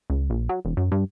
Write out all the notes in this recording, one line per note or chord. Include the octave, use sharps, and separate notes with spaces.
C#2
A#1
F#3
E1
F#2
G2